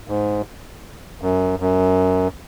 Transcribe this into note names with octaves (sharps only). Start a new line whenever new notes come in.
G#2
F#2
F#2